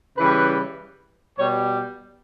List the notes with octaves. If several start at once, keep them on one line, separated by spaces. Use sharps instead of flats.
C#3 E3 G3 B4
B2 G3 C#5